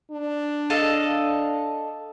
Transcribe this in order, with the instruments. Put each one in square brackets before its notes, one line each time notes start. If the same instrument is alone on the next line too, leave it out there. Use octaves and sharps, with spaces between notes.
[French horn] D4
[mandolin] A4 D#5 F5